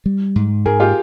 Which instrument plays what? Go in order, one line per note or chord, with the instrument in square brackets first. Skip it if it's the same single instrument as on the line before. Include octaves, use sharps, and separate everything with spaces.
[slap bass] G3
G#2
[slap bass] G#2 [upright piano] G#4 A#4
[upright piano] F4 G4